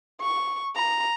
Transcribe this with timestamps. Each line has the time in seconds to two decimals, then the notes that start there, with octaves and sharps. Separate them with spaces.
0.21 C#6
0.75 A#5